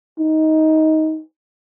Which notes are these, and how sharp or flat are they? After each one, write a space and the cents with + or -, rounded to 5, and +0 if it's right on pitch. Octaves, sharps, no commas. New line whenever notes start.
D#4 +15